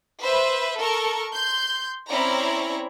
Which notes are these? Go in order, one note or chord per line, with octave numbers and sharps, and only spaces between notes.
B4 C5 E5
A4 A#4 C#6
C6 G6
C4 C#4 E4 C#5 D5 A#5